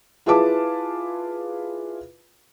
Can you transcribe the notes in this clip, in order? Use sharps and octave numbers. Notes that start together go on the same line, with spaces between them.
E4 F4 G#4 B4 A5 D6